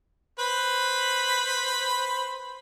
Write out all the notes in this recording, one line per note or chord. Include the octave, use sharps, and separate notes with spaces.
B4 C5 B5